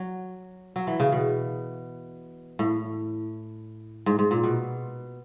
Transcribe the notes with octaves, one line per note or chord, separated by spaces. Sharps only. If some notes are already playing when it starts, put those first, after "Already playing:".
Already playing: F#3
F#3
E3
C#3
B2
A2
G#2
G#2
A#2
B2